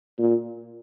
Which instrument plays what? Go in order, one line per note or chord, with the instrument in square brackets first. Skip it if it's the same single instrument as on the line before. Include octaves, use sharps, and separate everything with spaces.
[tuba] A#2